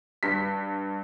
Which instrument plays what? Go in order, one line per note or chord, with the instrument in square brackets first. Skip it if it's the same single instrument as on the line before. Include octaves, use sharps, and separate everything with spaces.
[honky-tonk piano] G2 B6